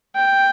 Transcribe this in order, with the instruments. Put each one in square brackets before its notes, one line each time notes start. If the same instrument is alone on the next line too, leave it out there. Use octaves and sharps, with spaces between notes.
[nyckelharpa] G5